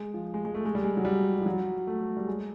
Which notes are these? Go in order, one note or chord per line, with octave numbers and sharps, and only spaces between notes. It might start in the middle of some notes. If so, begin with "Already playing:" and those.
Already playing: G#3
F3
G#3
G#3
A3
G#3
G3
G#3
F#3
G3
F3
F#3
A3
G3
G#3